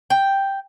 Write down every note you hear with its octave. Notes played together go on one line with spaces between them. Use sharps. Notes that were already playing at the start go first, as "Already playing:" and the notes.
G5